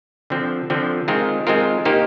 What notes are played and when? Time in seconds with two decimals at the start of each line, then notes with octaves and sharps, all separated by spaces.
0.30 D3 F3 C4
0.70 D3 F3 C4
1.08 D#3 G#3 C4 F4 A#4
1.47 D#3 G#3 C4 F4 A#4
1.85 D#3 A#3 D#4 G4 C5